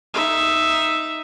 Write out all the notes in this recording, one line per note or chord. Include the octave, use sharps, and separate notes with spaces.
D#4 E5